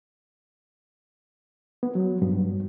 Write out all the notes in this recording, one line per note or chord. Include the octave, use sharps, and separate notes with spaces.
B3
F#3
G2